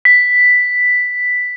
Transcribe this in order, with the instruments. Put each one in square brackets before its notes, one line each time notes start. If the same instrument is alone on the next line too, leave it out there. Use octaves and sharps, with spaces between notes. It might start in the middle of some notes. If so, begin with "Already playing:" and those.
[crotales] B6